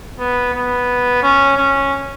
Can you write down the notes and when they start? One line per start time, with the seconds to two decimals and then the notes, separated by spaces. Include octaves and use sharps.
0.19 B3
0.54 B3
1.22 C#4
1.57 C#4